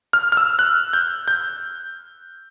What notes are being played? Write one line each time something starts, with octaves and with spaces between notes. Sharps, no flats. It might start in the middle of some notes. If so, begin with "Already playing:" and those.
F6
F6
E6
F#6
G6
G6